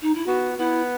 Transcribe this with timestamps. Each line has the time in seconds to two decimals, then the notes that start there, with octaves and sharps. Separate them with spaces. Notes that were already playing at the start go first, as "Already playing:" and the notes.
0.02 D#4
0.14 E4
0.26 B3 F#4
0.58 B3 E4